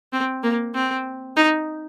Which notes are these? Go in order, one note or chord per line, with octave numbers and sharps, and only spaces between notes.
C4
A#3
C4
D#4